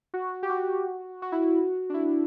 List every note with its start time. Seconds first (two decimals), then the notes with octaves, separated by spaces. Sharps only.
0.14 F#4
0.43 G4
0.50 F#4
1.22 F#4
1.32 E4
1.42 F#4
1.90 D4
1.94 E4